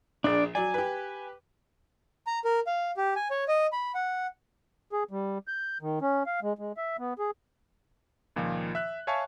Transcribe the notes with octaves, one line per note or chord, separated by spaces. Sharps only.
A#1 D4 G#4 D5
F#3 D5 G#5
G4 B4
A#5
A#4
F5
G4
G#5
C#5
D#5
B5
F#5
G#4
G3
G6
D#3
C#4
F5
G#3
G#3
E5
B3
G#4
C#2 A#2 D#3 F3
E5 F#6
C#5 E5 F5 G#5 A5 C#6